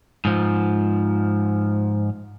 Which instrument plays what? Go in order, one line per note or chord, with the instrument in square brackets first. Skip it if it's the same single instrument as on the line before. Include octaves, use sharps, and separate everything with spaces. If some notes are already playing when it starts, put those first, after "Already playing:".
[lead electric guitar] G#2 F3